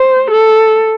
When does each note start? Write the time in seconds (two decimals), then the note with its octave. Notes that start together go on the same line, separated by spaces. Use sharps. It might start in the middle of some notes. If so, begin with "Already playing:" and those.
Already playing: C5
0.31 A4